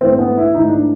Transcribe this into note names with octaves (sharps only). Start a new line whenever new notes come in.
G#2 E3 A3 C4
C4
B3
E4
G#2 E3 A3 D#4
D4